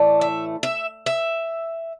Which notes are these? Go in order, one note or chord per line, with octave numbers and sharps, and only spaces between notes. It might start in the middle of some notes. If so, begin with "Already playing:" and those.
Already playing: A2 E3 A3 D5
E5
E5
E5